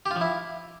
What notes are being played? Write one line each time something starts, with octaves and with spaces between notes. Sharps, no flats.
G4
F4
F3
E4